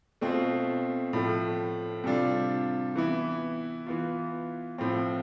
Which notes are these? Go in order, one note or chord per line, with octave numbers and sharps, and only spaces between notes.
B2 A3 C4 F4
A2 F3 A3
C3 G3 D4 F4
E3 B3 E4
E3 B3 F4
A2 F3 C4 F4